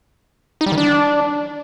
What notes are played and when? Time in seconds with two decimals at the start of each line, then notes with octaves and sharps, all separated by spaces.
0.61 D#4
0.66 G3
0.72 D#3
0.78 D4